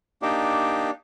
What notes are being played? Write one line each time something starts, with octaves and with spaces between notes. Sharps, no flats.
A#3 D4 D#4 G4